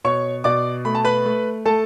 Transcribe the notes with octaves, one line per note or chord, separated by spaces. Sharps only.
B2 C#5 C#6
B2 D5 D6
A3 B5
A5
B4 B5
A3
A3 A4 A5